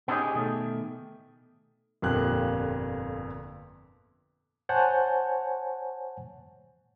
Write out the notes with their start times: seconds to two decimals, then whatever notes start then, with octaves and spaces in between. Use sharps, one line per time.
0.08 B3 C#4 D#4 E4 G4 G#4
0.34 B2 D#3 A3
2.02 G1 F2 A#2 D3 G4 F#6
4.69 C5 C#5 F#5 G#5 A5 G6